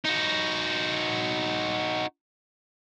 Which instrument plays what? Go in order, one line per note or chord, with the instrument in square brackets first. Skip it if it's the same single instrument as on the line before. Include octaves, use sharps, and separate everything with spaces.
[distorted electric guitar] D#4 F#4